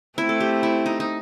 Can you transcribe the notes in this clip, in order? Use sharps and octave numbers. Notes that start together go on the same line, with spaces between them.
A3 C4 E4
A4
G4
E4
D#4
D#4